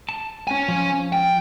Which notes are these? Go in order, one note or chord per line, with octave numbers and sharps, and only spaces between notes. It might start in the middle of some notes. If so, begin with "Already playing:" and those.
A5
C#4 G#5
F3
G5